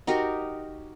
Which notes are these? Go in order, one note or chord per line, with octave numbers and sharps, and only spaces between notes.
D#4 F#4 G4 A#4